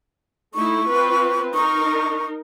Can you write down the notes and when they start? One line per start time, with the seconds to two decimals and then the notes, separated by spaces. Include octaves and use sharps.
0.54 A3 D#4 E4 C#6
0.89 C4 F4 B4
1.54 D#4 A#4 C#6